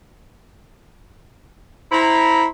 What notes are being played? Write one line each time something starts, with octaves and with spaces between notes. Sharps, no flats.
E4 C5 A#5